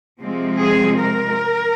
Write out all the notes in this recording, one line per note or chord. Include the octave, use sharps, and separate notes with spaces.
C3 F3 G#3 C4
G#4
A#4